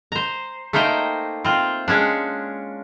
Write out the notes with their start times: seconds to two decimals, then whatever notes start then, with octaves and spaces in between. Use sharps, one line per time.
0.12 C5 A#5
0.73 A3 A#3 D#4 C5 G5
1.45 C4 F4
1.88 G#3 C#4 D4